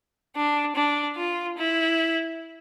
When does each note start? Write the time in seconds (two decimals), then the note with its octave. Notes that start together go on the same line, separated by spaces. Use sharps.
0.34 D4
0.75 D4
1.16 F4
1.57 E4